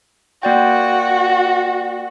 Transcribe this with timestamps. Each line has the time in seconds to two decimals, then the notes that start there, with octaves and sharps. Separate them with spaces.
0.43 A#3 F#4 D5 G5